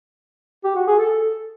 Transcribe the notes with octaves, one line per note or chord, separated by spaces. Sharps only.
G4
F#4
G#4
A4